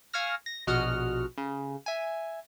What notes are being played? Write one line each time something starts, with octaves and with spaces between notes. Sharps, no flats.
F5 G#5 C#6 E6 F6 A#6
A#6
A#1 B2 F#4 D#5 F#5 F6
C#3
E5 G#5